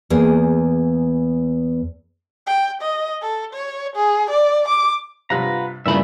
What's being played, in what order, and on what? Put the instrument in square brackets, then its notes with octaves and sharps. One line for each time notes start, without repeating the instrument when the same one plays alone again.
[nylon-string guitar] E2 A#3 G#4
[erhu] G5
D#5
A4
C#5
G#4
D5
D6
[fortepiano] G2 C3 [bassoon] F4 [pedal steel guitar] B4 F#5 A#5
[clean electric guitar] G2 C#3 B5 [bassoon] A#2 [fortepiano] E3 A3 [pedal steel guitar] E5